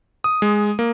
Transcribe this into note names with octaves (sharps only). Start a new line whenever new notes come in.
D#6
G#3
A#3